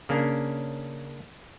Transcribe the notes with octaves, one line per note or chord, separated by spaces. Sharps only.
C#3 A#3 C#4 D4